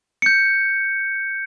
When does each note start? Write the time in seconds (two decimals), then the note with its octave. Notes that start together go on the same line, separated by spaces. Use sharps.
0.22 G6 C#7